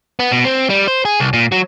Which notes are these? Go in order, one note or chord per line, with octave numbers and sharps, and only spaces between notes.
B3
B2
C4
G3
C5
G#4
C2
A#2
F#3